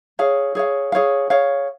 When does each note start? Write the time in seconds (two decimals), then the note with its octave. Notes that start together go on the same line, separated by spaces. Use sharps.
0.19 G#4 C#5 F5
0.55 G#4 C#5 F5
0.92 G#4 C#5 F5
1.30 G#4 C#5 F5